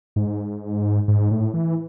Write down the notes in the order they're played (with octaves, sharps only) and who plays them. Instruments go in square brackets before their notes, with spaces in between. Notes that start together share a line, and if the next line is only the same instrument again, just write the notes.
[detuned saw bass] G#2
G#2
A2
E3